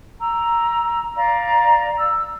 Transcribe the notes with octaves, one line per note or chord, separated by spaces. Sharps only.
A#5 E6
D5 F5 A#5
E6